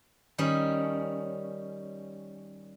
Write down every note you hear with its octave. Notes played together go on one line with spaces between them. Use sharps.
D#3 G3 C#4